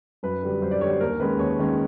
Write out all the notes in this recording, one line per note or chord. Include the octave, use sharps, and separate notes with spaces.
F#2 B4
D3 G3
F#2 C5
D5
D3 G3 C#5
C5
D#2 A#4
D#3 G#3 C#4 B4
D#2 C#5
D#3 G#3 C#4